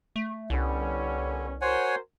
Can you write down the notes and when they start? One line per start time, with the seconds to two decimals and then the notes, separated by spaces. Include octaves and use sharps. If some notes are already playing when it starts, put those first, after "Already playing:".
0.16 A3
0.50 C2 D3 G3 B3 C#4
1.61 F#4 A#4 C5 C#5 F#5 G#5